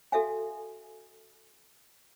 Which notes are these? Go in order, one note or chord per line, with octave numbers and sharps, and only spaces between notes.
F#4 A4 E5 F5 G#5